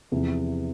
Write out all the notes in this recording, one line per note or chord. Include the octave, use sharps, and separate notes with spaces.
E2 C3 F3